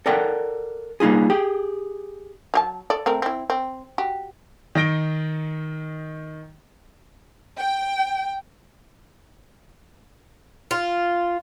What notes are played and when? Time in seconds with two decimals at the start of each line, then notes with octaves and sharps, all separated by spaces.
0.06 A4 A#4 D5 F#5 G5
1.00 G3 A#3 D#4 F4 G#4
1.30 G4 G#4 G5
2.54 F#3 G4 A5
2.90 A4 D5
3.06 A3 C4 A#4
3.22 C4 E4
3.50 C4
3.98 F#4 G4
4.75 D#3 D#4 A#6 D7 G7
7.59 G5
10.71 F4